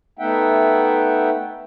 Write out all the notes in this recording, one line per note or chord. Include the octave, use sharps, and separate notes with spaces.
A3 B3 D#4 E5 F#5 G5